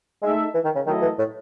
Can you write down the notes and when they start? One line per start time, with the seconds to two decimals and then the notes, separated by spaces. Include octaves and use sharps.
0.23 G#3 A3 D#4 A4 E5
0.55 E3
0.65 D#3
0.75 C#3
0.87 D#3 F#3 A3 E4 A4 D#5
1.02 E3
1.19 A2